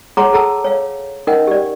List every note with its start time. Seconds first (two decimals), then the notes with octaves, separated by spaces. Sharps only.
0.17 G#4 C#5 F#5 A#5 C6 D6
0.33 G#4 A4 F#5 A5 A#5 E6
0.64 C#5 F5
1.27 C#4 D#4 A#4 D#5 F#5 G5
1.47 G4 D5